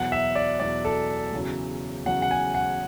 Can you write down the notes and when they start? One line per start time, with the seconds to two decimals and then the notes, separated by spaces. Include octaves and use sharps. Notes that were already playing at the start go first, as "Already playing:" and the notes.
Already playing: E2 B2 F#3 F#5
0.12 E5
0.35 D5
0.60 E2 B2 F#3 D5
0.85 A4
1.33 E2 C#3 F#3
2.06 E2 C#3 F#3 F#5
2.22 F#5
2.31 G#5
2.55 F#5